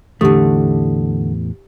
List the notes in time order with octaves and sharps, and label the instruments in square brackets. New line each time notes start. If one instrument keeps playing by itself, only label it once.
[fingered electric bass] E2 A2 E3 [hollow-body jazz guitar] D3 A3 [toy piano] D#4 G4 D#6